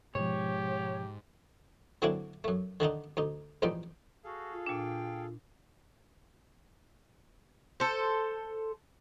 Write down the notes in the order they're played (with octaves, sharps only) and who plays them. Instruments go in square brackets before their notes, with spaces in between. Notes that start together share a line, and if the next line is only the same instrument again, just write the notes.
[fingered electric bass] G#2 G#3 [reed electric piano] B2 F3 [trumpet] G4 [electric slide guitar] C#5
[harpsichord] D3 F#3 A#3 C4 D4 E4
F#2 A3
D3 D#3 D4 D#4
D2 D#4
A1 E2 F3 G3 D#4 G5
[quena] F#4 [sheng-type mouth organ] G#4 A4 F5
[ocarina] F4
[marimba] A#2 D4 [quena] G5
[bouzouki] A4 C5